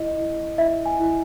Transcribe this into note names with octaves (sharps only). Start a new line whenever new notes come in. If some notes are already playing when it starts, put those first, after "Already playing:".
Already playing: E4 D#5
E4
E4 E5
G#5
E4